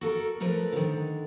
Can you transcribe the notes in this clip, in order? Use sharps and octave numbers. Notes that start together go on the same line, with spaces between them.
F#4 A4 A#4
F3 A3 A#4 B4
D3 D#3